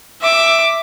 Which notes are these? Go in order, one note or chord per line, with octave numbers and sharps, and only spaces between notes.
E5 D6